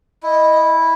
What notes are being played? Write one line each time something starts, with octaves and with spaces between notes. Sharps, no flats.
E4 D#5